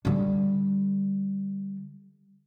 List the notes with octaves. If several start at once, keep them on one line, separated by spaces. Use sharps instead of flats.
D3 G3